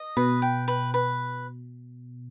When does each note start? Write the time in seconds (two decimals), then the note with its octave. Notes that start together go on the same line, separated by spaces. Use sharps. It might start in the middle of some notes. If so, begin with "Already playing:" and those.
Already playing: D#5
0.17 B2 B4
0.42 G5
0.68 B4
0.94 B4